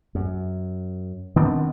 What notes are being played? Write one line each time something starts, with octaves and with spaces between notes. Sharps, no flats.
F#2
D#3 B3 C4 D4